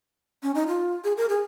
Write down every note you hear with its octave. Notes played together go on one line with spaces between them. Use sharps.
C#4
D#4
F4
G#4
A#4
G#4